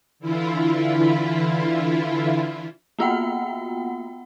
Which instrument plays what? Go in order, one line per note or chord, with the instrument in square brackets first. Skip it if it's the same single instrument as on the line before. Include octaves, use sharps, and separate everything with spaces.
[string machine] D3 E3 E4 F4
[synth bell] A#3 B3 F4 F#4 F#5 G5